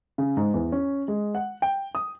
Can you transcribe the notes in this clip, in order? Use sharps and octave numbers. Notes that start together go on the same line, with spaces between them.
C#3
G#2
E2
C#4
G#3
F#5
G5
D#6